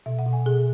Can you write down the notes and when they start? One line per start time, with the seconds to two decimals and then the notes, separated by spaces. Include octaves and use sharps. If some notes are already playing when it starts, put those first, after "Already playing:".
0.06 B2 E5
0.19 F#5
0.26 B2
0.33 G#5
0.46 B2 G#4